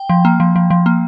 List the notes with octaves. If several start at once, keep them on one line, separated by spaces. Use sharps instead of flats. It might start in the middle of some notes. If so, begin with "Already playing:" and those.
Already playing: G5
F3
A#3
F3
F3
F3
A#3